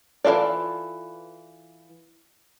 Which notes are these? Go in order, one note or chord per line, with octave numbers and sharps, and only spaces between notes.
E3 F3 F4 A4 D5